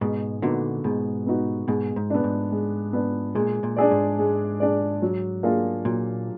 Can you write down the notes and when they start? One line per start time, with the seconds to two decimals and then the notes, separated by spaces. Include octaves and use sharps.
0.01 G#2 B2 G#3
0.42 A#2 D3 B3 D#4 F#4
0.84 G#2 B2 G#3
1.26 B3 D#4 F#4
1.68 G#2 B2 G#3
1.96 G#2
2.10 B3 D4
2.24 G#2
2.52 G#3
2.93 B3 D4
3.35 A#2 G#3
3.63 A#2
3.76 D4 G#4 D5
3.91 G#2
4.19 G#3
4.60 D4 G#4 D5
5.02 F#3
5.43 A#3 D4 F4 G#4
5.85 A#2 F#3